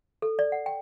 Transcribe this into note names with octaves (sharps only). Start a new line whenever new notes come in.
A4
D5
F#5
G5